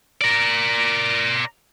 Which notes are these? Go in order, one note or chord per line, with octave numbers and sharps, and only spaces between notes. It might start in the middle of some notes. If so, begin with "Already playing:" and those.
A#4 D5